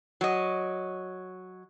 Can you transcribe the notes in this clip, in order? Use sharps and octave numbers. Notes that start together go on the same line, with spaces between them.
F#3 D#5